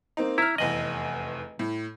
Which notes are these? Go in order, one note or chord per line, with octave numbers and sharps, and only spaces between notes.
A#3 C4 D#4
E4 A#5 F6
F1 E2 D#5 F#7
A2